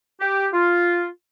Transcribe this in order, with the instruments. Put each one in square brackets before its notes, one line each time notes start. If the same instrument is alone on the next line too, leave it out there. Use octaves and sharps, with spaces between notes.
[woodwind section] G4
F4